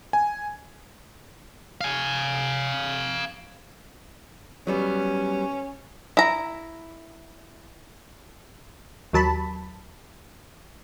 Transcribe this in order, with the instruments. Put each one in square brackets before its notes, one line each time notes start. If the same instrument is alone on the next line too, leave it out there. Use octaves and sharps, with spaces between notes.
[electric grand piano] G#5
[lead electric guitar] F5 G#5
[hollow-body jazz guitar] F#3 G3 B3 [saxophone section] C#4
[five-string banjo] E4 A#5
[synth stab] D#2 F#3 A5 B5